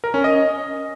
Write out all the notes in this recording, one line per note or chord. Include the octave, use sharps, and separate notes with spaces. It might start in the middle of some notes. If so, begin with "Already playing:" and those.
A#4
C#4
D#5